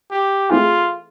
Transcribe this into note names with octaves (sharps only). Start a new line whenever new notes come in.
G4
E3 A3 C4 E4 F4 G#4